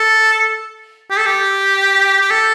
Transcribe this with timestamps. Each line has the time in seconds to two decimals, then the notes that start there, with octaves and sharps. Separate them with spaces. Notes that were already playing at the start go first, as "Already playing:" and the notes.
Already playing: A4
1.11 G4
1.18 A4
1.26 G4
2.21 G4
2.30 A4